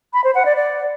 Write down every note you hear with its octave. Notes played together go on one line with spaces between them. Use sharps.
B5
C5
F#5
D5
D5